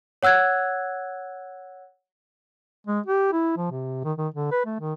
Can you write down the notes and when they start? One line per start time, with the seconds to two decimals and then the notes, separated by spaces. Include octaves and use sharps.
0.23 C#5 F#5 E6 F#6 G#6
2.87 G#3
3.06 G4
3.32 E4
3.57 F3
3.71 C3
4.04 D#3
4.18 D#3
4.34 D3
4.51 B4
4.66 A3
4.80 D#3